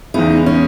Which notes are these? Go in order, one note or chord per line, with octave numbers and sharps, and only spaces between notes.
E2 C#3 G#3 B3 D#4 E4
C#4